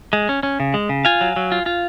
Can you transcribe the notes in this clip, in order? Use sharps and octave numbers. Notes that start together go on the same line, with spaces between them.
G#3
C#4
C#4
C#3
G#3
C#3
F4 F5 G#5
F#3
F#3
F4
F4